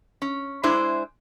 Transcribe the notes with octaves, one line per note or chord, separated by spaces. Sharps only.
C#4
G#3 D4 E4 C5